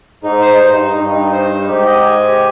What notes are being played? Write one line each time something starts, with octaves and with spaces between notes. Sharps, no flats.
G#2 D#4
C5
G2 D#4
D#4
G2 D#4
D#4
C5
D#4
G#2 G4
D#5
G#5
G4